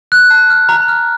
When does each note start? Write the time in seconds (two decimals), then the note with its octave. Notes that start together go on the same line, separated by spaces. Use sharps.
0.12 F#6
0.30 A5
0.50 F6
0.69 A#5
0.88 F6